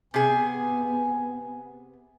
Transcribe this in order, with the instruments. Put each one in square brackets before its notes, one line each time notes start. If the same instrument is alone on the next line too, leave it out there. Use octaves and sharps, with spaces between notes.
[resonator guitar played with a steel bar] C3 G#4 [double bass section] B3 [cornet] G#5